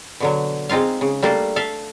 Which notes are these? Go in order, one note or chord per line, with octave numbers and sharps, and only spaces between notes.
B2 D3 F#3
G#3 C4 D#4 F4 F5
C#3
G3 A3 A#3 D4 A4
A4 E5 F5